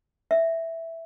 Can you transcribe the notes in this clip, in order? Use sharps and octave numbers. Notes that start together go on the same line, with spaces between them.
E5